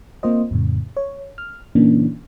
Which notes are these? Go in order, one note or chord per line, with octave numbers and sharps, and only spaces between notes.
A#3 C4 F4 C5 D#5
F2 A2 C#3
C#5
F6
A#2 C#3 E3 A#3 C#4 D4